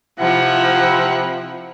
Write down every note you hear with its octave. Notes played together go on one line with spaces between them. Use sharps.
C3 F3 E4 F#5